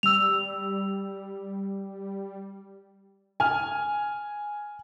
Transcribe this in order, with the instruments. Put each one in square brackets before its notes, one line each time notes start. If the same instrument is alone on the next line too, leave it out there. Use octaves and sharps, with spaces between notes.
[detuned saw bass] G3 [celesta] E6 F7
[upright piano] G#5 F6